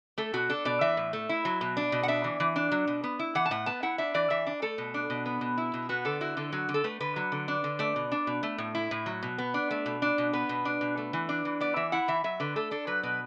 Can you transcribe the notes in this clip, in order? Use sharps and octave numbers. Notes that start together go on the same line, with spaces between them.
A3 A4
B2 F#4
D4 A4
B2 D5
E3 E5
A2
A3
E4
F#3
B2
D4
B2
F#5
D4 E5
E3
E3
D4
F#3
B2
B3
E4
E3 F#5
A5
A2 F#5
B3 A5
E4 F#5
D4 E5
E3 D5
E3 E5
D4
A3 A4
B2
D4
B2
B3
B2
E4
B2
B3 F#4
D3 A4
E4 F#4
D3 A4
F#3 F#4
D3
A4
A3 B4
D3 B4
F#3
D3
D4
D3
A3 D5
B2
D4
B2
A3
A2
E4
A2
F#3
B2
B3
D4
A3
B2
D4
B2
B3 B4
B2
D4
B2
A3
E3
D4
E3
B3 D5
E3 E5
E4 F#5
E3 E5
F#3 E5
D3 B4
A3 A4
D4 A4
F#3 B4
B2 B4